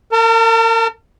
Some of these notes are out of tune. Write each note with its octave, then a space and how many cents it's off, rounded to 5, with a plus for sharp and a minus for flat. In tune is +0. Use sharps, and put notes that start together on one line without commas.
A#4 -35 A5 +30